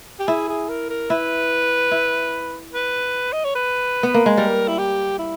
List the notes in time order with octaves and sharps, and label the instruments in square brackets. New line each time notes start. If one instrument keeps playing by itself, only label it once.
[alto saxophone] G4
[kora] E4 [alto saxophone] G#4
[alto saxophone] G#4
A#4
A#4
[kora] E4 [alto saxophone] B4
[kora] E4
[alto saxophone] B4
D#5
C#5
B4
[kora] B3
A#3
G#3
[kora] G3 [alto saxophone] A#4
[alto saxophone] E4
G4
E4